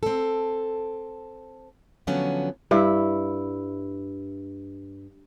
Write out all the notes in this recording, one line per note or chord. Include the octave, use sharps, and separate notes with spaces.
C4 A4
D3 F3 F#3 B3 C#4
G2 E4